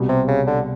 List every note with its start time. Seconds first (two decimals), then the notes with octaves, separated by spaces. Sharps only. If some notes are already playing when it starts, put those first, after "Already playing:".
Already playing: C2 B2 G3
0.09 C3
0.28 C#3
0.47 D3